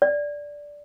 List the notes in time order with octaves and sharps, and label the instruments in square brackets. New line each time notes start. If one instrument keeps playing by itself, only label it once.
[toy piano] D5